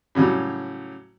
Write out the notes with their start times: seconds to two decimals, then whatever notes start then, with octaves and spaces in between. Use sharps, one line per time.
0.15 A2 C#3 F#3 G3